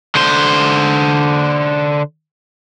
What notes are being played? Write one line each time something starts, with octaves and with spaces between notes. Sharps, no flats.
D3 C5